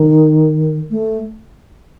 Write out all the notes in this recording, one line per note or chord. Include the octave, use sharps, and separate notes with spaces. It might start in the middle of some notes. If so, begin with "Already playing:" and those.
Already playing: D#3
A3